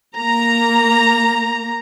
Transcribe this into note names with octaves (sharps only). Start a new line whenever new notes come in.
A#3 A#5